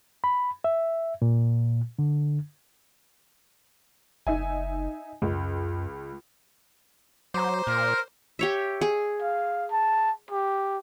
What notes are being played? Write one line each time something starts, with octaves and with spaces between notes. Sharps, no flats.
B5
E5
A#2
D3
F#1 D#4 E5 G#5
C#2 F#2
F#3 C5 A#5 D6
A#2 A#4
G4 C#5 E5
G#4
F5
A5
G4